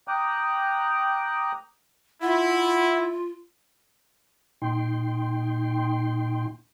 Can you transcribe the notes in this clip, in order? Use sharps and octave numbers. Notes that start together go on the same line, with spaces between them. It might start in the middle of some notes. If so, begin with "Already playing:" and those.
G5 A#5 D6 D#6 F#6
E4 F4 F#5
A#2 D#4 G5 C6